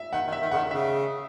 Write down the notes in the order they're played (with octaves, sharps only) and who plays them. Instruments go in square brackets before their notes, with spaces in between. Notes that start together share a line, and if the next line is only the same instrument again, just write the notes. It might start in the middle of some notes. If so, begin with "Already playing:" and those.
Already playing: [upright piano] E5
[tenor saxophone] D#3 [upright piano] F#5
[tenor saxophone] D#3
[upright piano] E5
[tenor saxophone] D#3
[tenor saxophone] C#3 [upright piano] F#5
[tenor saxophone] D#3
[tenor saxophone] C#3 [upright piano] E5